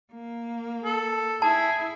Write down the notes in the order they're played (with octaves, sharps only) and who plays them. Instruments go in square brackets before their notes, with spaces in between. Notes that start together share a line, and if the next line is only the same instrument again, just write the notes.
[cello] A#3
[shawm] A4
[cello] E4 [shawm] G#4 [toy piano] A5